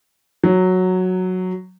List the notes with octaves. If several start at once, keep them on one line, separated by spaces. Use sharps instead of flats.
F#3